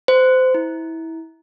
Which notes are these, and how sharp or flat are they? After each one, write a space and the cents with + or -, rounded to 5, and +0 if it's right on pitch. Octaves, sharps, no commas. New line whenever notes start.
C5 -25
E4 -20